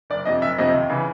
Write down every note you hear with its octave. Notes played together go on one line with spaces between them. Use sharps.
F#1 D5
F2 C3 D#5
F#1 E5
F2 C3 D#5
D#2
C#3 E3